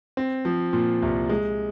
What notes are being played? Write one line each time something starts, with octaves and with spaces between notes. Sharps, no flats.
C4
F3
A#2
C2
G#3